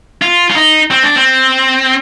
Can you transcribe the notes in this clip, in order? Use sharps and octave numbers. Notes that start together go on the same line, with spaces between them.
F4
F4
D#4
C4
D4
C4